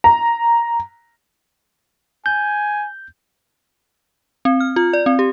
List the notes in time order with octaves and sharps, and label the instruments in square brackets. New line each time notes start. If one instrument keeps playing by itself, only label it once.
[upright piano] A#5
[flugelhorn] G#5 [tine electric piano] G6
[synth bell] C4
F6
F4
D5
C4
G4